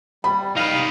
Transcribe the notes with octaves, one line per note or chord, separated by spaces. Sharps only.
G3 B5
D#4 B4 F5